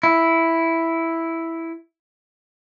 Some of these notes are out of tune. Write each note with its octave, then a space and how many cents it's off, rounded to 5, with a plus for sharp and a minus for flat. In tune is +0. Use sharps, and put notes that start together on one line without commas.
E4 +0